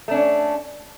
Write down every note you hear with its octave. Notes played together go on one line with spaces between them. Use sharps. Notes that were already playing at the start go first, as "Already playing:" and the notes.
A3 C#4 D4